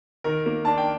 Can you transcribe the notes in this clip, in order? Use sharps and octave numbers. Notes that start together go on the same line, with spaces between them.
D#3 A#4
A#3
D4 A5
G5